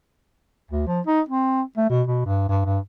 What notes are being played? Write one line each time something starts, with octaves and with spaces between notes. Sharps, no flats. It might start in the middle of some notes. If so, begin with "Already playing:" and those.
D2
F3
D#4
C4
A3
B2
B2
G2
G2
G2